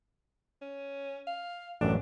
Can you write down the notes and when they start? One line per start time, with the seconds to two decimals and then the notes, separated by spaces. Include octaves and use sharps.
0.62 C#4
1.27 F5
1.81 A1 F#2 D4